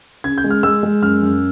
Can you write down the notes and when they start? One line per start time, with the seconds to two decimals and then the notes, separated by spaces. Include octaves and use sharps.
0.24 C#3 G#6
0.38 G6
0.44 G#3
0.50 F6
0.63 G#3 E6
0.83 G#3
1.02 F#2 F6
1.22 F#2